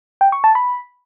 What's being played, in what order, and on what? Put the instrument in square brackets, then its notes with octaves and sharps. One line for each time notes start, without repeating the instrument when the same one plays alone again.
[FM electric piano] G5
C#6
A5
B5